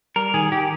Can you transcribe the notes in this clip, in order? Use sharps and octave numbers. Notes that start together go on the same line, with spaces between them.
G3 A#4
D#3 G#4
D#3 G4